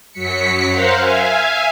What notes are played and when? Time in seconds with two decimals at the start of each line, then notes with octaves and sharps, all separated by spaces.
0.12 F#2 F#3 B6 C#7
0.68 A#4 C5 F5 F#5
0.99 E5 F5 G#5